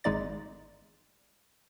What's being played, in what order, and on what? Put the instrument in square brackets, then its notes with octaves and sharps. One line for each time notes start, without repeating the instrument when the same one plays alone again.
[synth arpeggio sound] G#1 G#3 D#4 D5 A6